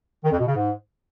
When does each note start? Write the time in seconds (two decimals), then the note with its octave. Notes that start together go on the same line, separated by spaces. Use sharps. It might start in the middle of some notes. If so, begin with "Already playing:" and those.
0.24 D#3
0.31 F2
0.39 B2
0.47 C#3
0.55 G#2